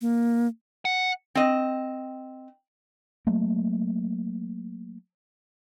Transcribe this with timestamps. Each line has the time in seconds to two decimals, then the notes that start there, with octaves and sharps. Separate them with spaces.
0.01 A#3
0.85 F#5
1.35 C4 D#5
3.27 F#3 A3 A#3